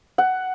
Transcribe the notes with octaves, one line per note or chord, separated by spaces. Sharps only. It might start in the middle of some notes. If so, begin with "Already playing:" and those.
F#5